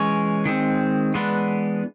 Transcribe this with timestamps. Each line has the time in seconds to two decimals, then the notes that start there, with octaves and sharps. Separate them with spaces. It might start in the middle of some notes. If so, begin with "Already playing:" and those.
Already playing: E3 G#3 C#4 C#5
0.46 D#3 G#3 C4
1.14 E3 G#3 B3 D4